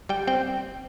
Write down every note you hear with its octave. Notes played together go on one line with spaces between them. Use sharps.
G3 G5
C4 G5